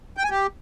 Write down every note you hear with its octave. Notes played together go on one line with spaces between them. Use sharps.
G5
G#5
G4